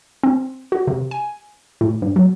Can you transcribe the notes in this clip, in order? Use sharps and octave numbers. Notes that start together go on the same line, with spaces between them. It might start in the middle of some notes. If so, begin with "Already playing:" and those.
C4
F#4
C3
G#5
A2
G2
F#3